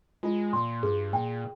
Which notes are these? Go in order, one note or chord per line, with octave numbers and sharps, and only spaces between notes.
G#3 F4
A#2 C6
G2 G#4
A#2 G5